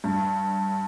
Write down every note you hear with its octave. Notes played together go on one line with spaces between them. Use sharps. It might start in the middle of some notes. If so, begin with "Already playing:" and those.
G2